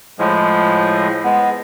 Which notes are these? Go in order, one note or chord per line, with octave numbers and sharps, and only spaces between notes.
A2 F3 G#3
G#3 B3